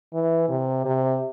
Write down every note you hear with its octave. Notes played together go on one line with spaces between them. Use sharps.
E3
C3
C3